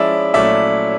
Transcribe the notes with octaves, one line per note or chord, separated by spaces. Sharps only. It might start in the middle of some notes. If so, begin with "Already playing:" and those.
Already playing: F3 G#3 C#4 E4 D5 E5
A#2 F#3 A3 C#4 E4 D5 E5